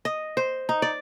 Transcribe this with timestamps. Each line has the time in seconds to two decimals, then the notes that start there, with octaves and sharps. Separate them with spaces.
0.05 D#5
0.37 C5
0.69 D#4
0.82 D5